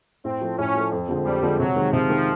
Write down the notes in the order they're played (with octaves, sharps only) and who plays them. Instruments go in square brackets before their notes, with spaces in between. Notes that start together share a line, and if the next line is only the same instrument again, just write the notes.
[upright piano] A2 [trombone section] C4
[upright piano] F3 A3
[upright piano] A2 [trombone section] C#4
[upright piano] F3 A3
F2
D3 F3 G#3 C4
[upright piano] F2 [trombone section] G3
[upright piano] D3 F3 G#3 C4
[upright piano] C3 [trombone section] F#3
[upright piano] D#3 G#3
[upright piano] C3 [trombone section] F3
[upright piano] D#3 G#3